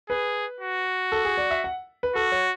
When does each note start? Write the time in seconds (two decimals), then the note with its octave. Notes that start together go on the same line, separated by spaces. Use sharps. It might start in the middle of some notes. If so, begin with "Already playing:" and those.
0.10 G#4 B4
0.60 F#4
1.12 A4
1.25 G#4
1.37 D5
1.51 E5
1.64 F#5
2.03 B4
2.16 F#4 A4
2.32 C#5